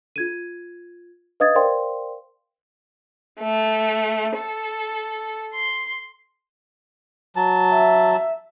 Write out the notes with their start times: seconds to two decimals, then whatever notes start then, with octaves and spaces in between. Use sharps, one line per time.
0.16 F4 G#6 D#7
1.40 B4 D#5 F5 D#6 G#6 A6
1.55 A#4 C5 D5 F5 G5 C6
3.40 A3
4.37 A4
5.54 C6
7.36 F#3 A5
7.72 E5